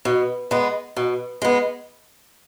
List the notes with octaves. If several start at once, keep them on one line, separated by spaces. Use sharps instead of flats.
B2
G#3 B3
B2
G#3 B3